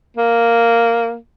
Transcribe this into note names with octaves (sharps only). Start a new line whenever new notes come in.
A#3